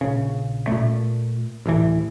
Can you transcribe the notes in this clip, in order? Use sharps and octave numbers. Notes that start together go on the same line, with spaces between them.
A#1 C#3
A#2 A3
A1 D2 E3